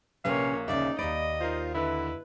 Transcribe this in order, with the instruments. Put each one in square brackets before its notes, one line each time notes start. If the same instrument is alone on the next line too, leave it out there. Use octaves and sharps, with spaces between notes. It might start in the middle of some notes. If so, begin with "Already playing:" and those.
[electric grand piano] A#1 [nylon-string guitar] C3 C#4 B4 [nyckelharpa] A#3 C#5 [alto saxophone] F5
[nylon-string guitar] D2 C#3 E5 [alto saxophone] D#4 [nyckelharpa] D5
[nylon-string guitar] D#2 D5 [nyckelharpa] D#5 [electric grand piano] B5 A6 D7
[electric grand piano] D#4 A#4 C5 [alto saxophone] F4
[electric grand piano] D3 E5 [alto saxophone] E4 [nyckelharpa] B4